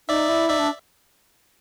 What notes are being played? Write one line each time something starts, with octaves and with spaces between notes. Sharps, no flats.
D#4 D5 E5
E4
D#4 D5 E5
D4